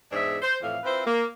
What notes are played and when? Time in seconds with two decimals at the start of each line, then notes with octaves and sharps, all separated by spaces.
0.11 E2 G#2 D4 G#4 E5
0.42 C5
0.62 F2 A2 E3 F5
0.83 C4 E4 F4 B4 C5
1.05 A#3